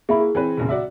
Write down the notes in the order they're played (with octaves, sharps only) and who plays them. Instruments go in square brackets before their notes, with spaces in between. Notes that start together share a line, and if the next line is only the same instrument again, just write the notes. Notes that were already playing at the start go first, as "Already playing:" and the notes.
[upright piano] A#3 E4 [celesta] G#4 E5 B5
[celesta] G#4
[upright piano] E3 C4 B4
E1 A#1 C#3
F#4 D5 E5